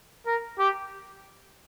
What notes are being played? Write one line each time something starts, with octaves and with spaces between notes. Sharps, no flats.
A#4
G4